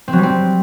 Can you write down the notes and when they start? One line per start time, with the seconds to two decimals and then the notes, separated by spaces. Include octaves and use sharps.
0.08 C4
0.13 F#3
0.18 G3
0.23 C4